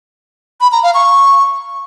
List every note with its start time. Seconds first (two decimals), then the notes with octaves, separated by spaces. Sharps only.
0.61 B5
0.72 A#5
0.83 F5
0.94 C#6